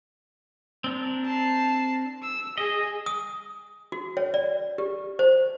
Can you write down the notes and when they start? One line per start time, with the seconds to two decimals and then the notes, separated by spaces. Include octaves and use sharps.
0.84 C4 D4 A#4
1.25 A5 C7
2.22 E6
2.58 G#4 D#5
3.06 D#6
3.92 F#4
4.17 C#5
4.34 D5
4.78 G4
5.19 C5